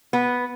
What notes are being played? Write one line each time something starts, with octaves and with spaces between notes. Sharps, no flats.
B3